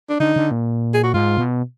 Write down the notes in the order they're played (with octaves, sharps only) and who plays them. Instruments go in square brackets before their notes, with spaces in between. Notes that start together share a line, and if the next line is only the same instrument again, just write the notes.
[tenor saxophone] D4
[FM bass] D3 [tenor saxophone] D#4
[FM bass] D3
A#2
[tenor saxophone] G#4
F#4
[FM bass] G#2 [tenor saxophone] F4
[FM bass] B2